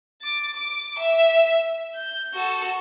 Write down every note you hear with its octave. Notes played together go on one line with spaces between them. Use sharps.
D6 A6
D6
E5
G6
F#4 A4